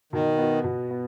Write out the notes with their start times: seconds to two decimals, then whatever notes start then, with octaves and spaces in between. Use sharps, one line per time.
0.13 B2 D#3
0.38 B3 F#4
0.64 B2
0.90 B3